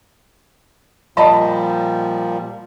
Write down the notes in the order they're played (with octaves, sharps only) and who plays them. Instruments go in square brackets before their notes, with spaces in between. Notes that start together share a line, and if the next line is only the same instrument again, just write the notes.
[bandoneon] A#2 F3 G3 [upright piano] D#5 A5 B5